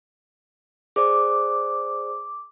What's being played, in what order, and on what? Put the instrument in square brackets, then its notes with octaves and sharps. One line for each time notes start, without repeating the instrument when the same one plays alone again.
[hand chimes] G#4 C5 D5 [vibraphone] D6